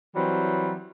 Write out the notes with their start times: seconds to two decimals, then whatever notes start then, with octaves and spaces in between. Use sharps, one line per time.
0.16 E3 F#3 G3 C4